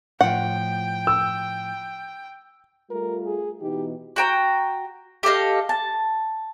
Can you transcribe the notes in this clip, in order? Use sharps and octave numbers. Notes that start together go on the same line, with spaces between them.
A2 F3 F#5 G5
E6
G3 A3 F4 A#4
G#4
B2 E3 D#4 G4
F#4 G5 A#5
G4 A4 D#5 F5
A5